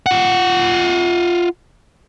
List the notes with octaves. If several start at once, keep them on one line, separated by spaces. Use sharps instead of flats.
F4 F#5